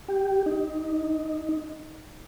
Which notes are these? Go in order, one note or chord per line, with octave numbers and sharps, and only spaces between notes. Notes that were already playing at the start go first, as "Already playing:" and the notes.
G4
D#4